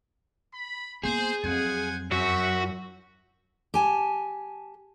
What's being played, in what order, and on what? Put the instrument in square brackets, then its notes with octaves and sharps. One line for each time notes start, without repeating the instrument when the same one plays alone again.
[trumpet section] B5
[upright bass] A#3 B3 [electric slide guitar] G#4 [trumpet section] C5
[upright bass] F2 F#3 [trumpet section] C5 F#5 G#5
[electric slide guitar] F#2 [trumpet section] C4 E5 [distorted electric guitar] F#4
[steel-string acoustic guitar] G4 G#5 A5